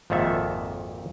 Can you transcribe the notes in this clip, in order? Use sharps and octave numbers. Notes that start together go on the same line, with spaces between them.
G#1 F2 A#2 D#3 A4 E5